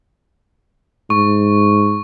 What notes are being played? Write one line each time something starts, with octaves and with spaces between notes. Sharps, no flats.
G#2 C#6